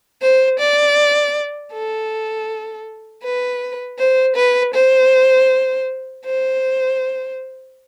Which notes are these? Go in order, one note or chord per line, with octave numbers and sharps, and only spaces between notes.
C5
D5
A4
B4
C5
B4
C5
C5